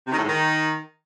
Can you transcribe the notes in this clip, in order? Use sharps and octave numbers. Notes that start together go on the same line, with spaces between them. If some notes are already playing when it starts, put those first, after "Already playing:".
C3
D#3
A2
G#2
D#3